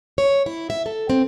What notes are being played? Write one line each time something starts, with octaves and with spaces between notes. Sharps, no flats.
C#5
E4
E5
A4
C4